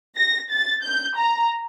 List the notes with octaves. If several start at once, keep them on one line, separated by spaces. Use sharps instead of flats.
A#6
A6
G6
A#5